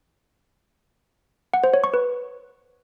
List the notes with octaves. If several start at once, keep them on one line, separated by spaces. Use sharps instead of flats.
F#5
C5
C#5
C#6
B4